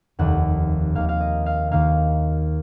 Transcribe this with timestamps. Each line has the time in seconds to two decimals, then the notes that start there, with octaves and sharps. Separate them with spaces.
0.19 F1 D#2 D#3 F#5
0.95 D#2 D#3 A#3 F5
1.09 F5
1.20 D#5
1.46 F5
1.71 D#2 D#3 A#3 F5